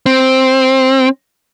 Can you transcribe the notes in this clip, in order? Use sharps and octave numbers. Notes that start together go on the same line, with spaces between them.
C4